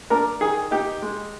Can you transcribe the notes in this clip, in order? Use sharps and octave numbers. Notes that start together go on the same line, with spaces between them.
D4 A#4
D#3 G#4
D#4 G4
G#3